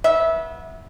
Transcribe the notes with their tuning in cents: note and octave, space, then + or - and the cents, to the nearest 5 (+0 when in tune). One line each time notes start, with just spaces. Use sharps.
B3 -25 E5 -15